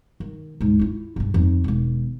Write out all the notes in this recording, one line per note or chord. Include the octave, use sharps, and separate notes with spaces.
D#3
D2 G#2
E4 F4
G1 C#3
F2 D#3
E1 D#3